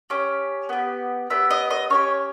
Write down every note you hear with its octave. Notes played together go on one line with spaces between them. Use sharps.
C#4 G4
B3 G4
B3 G4 E5
D#5
D#5
C#4 G4 C#5